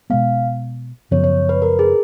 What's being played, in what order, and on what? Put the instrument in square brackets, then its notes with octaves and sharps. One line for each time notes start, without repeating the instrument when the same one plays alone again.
[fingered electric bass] B2 G#3 B3 [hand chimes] F5
[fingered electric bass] F#2 C#3 F3 B3 [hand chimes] C#5
[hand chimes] C#5
B4
A#4
G#4